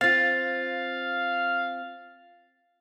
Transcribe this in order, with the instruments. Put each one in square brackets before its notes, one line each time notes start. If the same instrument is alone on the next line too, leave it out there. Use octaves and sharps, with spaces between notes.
[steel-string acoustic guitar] C4 F4 [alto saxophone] F5 [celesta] A6